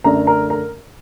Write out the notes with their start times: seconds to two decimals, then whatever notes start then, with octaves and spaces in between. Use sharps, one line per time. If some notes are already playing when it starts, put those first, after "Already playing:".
0.04 F#2 D3 A3 D4 A#4 A#5
0.27 A#4 A#5
0.50 A#4 A#5